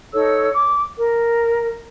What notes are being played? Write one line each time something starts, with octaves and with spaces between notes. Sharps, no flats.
D#4 A4 C#5 E6
D6
A#4